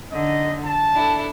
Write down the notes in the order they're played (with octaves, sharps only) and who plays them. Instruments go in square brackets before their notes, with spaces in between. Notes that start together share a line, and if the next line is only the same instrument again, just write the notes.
[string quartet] D3 [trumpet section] D#4 D#5
[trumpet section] A5
[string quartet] D4 E4 A4